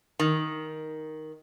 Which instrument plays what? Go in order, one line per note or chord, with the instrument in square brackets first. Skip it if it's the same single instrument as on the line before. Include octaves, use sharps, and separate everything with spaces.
[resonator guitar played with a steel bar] D#3